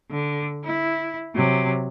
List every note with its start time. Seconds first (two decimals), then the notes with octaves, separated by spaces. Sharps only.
0.11 D3
0.64 E4
1.35 C3 F#3